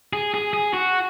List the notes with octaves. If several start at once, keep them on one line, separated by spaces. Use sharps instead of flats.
G#4
G#4
G#4
F#4